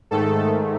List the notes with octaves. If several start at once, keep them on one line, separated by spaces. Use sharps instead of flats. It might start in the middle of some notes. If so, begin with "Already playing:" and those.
G#2 D#3 A3 A4